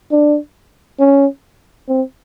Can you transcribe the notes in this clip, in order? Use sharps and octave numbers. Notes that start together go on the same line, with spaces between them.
D4
C#4
C4